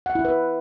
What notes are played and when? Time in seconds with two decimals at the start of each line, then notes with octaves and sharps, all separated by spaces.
0.06 F#5
0.15 E4
0.25 B4